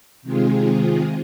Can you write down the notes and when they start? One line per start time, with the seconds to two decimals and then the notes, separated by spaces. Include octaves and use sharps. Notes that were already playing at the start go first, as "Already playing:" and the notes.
0.22 C3 D#3 G#3 C4 F4 G#4